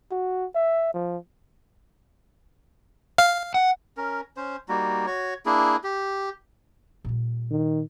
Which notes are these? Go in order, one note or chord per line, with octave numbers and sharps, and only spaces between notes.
F#4
E5
F3
F5
F#5
C#4 A#4
C#4 C5
G3 A#3 D#4 F#4
F#4 C#5
A#3 D4 E4 G#4
G4
A#2 G3
D#3